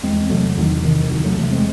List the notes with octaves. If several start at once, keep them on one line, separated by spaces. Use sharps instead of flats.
E2 G#3 C4
C3 F#3 A3
E2 D#3 F#3
C3 D#3
E2 D#3 F#3
F#3 A3
C3 F#3 A3
G#3 C4